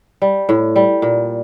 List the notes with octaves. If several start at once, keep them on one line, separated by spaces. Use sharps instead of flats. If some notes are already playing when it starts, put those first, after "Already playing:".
G3
A2
G3
A#2